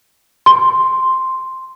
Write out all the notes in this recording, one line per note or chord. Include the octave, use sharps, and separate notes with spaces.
C6